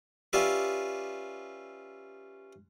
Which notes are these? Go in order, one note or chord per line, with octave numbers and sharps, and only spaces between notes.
C#4 F4 G4 B4 D5 E5